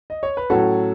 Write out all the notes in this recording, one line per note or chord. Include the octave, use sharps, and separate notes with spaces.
D#5
C#5
B4
A2 F#3 C#4 F#4 A4